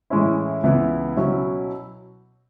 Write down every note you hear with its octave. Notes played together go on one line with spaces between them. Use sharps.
A2 E3 G#3 C#4 E4
C#2 C#3 E3 B3 E4
B2 F#3 C#4 E4